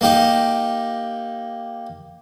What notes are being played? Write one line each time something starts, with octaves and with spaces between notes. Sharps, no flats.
A#3 D#4 G4